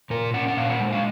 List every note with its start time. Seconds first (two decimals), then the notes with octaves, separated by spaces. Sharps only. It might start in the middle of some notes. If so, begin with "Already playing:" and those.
0.10 A#2 A#4
0.34 C#4 F#5
0.48 F#5
0.57 A#2 F5
0.69 F#5
0.81 G#3
0.92 F5